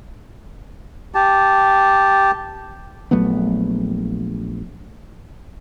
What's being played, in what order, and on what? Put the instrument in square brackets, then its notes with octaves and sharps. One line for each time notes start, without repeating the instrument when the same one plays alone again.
[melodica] G4 A5
[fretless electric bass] A#1 F#3 A3 B3